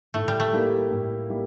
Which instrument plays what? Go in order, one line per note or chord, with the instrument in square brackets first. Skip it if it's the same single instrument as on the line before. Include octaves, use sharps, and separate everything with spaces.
[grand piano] A2 [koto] A3
[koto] G3
A3
[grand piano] G3 A#3 E4 G4
A2
G3 A#3 E4 G4